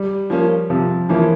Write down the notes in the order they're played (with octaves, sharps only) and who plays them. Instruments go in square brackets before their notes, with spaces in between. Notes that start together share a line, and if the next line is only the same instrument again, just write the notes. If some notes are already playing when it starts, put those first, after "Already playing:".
Already playing: [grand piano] G3
[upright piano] F3 A#3 C#4
[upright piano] C3 [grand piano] F3
[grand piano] E3 [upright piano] F3 A#3 C#4